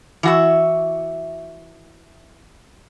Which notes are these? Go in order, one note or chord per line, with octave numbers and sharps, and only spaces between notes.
E3 F#4 E5